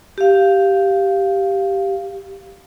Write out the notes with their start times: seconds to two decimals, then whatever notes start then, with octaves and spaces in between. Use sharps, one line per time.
0.18 G4 F5